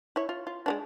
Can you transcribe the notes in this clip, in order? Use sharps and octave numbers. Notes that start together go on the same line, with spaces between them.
E4 C#5
F4
F4
G#3 B3 D4